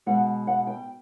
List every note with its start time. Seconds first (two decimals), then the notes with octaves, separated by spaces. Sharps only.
0.06 B2 G#3 F#5
0.47 F#5
0.67 G5